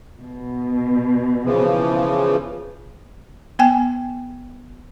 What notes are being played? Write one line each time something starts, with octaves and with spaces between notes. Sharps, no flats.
B2
C#3 E3 F3
B3 G5 G#5